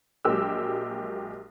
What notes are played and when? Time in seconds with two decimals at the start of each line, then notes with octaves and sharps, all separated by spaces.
0.25 A#1 F#3 G#3 A#3 G4 E6